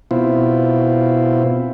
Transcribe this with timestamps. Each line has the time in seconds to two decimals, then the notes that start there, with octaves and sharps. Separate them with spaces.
0.11 B2 C4 E4 F4